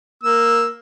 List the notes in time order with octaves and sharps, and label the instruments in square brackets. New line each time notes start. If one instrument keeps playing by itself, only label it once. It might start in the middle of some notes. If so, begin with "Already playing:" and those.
[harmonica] A#3 E6